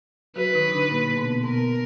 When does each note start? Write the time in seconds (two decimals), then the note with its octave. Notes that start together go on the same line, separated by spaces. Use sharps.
0.36 F#3 F#4 B4
0.54 D#3 D#4
0.68 D#4
0.72 D3 D4
0.90 A#2 A#3
1.07 A#3
1.16 B2 B3
1.44 B2 B3 A#4